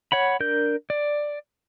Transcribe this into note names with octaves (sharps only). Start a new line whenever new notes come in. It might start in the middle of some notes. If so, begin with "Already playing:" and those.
C#5 F#5 B5
D4 A#4 G6
D5